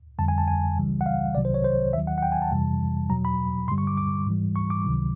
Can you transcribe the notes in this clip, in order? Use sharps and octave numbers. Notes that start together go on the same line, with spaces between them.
F2 D3 G3 A5
G#5
A5
G#5
C#2 C#3 E3 G3
F#5
F5
C2 C3 D#3 F#3 D5
C5
C#5
C5
D#2 D#3 F#3 E5
F#5
F#5
G5
G#5
A5
F2 C3 E3 G3
E2 B2 F#3 A#5
B5
G2 D3 G3 C6
C#6
D6
D6
G#2 E3 G3
C#6
D6
C#2 C3 D#3 F#3